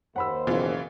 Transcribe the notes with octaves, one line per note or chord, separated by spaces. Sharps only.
D#2 C5 F#5 B5 E6
F#1 B2 E3 F4